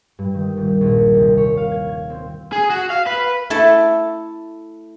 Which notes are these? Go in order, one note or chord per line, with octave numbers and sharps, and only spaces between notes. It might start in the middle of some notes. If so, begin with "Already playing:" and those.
G2
D#3
D#1
A#1
C2
C#5
F5
G#6
G#6
C4
G#4
F#4
F5
B4
A3 E4 A4